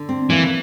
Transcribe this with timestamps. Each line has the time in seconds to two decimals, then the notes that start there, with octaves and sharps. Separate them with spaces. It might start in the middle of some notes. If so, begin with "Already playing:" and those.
Already playing: D3
0.09 C4
0.30 E3 A#3